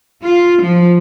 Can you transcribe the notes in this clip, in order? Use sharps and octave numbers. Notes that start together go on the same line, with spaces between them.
F4
F3